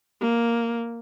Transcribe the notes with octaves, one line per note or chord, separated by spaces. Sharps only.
A#3